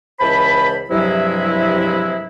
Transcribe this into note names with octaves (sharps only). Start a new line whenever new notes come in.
C#2 E3 C5 A5 B5
G2 C3 F3 F#3 G#3 E4